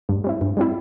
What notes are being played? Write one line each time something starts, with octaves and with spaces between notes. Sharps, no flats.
G2
G3 C4 E4
G2
G3 C4 E4